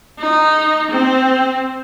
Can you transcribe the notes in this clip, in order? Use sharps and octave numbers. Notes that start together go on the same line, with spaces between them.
D#4
C4